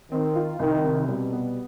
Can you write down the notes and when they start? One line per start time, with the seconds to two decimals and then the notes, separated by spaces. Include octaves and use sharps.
0.12 D#3 C4
0.36 F4
0.59 C2 D#3
0.84 C3
1.08 B2 G3
1.32 B3